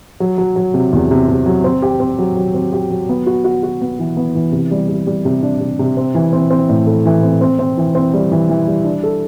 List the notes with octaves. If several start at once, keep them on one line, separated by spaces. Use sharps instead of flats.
F#3
F#3
F#3
C3
E2
C3
C3
F#3
C4
G4
C4
F#3
F#3
C4
G4
F#3
B3
F#4
F#4
F#4
B3
E3
B3
E3
C3
G3
G3
G3
C3
D4
C3
C3
C4
E3
C4
C4
A2
A3
E3
C4
C4
C4
E3
C4
G3
E3
E3
G3
D4
A4